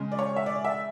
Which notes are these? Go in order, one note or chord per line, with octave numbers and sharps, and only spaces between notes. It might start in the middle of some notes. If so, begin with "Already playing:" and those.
Already playing: C#3 G#3
D5
C#5
E5
D5
E5